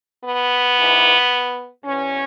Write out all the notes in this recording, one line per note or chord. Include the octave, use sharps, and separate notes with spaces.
B3
G#2 E3
E2 B2 C#4